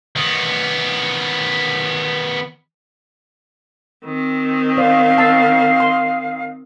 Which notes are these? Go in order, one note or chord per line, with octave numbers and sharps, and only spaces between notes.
D#3 B3
D#3 C4
C5 D5 F5
A5 E6
C6